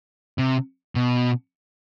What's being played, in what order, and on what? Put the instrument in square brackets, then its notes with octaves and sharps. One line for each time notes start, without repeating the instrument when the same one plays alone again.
[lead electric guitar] C3
B2